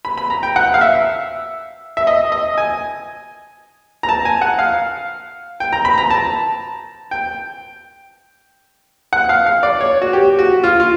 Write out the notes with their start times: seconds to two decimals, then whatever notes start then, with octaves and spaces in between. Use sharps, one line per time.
0.05 B5
0.18 B5
0.30 A#5
0.43 G5
0.56 F#5
0.74 F5
0.81 E5
1.97 E5
2.07 D#5
2.32 D#5
2.58 G#5
4.03 A#5
4.09 A5
4.25 G#5
4.42 F#5
4.59 F5
5.60 G5
5.73 A#5
5.85 B5
5.98 A#5
6.10 A5
7.11 G5
9.13 F#5
9.29 F5
9.46 F5
9.63 D5
9.81 C#5
10.02 F#4
10.13 G4
10.39 F#4
10.64 F4
10.80 F4